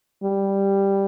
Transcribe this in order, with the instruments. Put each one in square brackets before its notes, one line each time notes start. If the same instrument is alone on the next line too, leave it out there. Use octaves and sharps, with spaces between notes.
[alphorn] G3